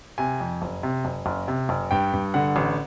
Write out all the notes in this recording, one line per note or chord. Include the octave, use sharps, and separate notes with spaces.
C3 G#5
F2
F#1
C3
F#1
F#1
C3
F#1
G2 G5
G2
D3 F#5
A1